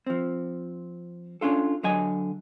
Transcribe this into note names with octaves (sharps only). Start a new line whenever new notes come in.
F3 C4
C#4 D4 F4 A4
D3 F#3 D#5 G#5